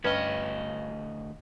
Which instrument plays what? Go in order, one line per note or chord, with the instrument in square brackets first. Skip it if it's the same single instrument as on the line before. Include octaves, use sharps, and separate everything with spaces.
[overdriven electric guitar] D2 D#5 [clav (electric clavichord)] G2 C#4 [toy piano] B4